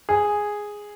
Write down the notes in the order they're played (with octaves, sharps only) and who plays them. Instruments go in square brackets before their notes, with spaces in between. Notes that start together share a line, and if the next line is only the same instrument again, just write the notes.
[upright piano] G#4